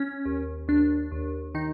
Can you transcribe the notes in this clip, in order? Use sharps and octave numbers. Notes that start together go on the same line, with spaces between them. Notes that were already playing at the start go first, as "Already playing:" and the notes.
Already playing: C#4
D#2
D#2 D4
D#2
D#3 D#4